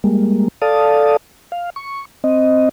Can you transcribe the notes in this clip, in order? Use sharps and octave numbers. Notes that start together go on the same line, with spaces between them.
G3 G#3 A#3
A4 D5 F5 A5 D#6
F5
C#6
C4 D#5